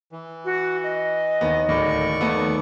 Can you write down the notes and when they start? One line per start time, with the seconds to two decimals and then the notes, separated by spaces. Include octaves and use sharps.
0.12 E3
0.45 F#4
0.83 D#5
1.41 D#2 B3
1.68 D1 A2 D5 C#6
2.21 D#2 A3 B3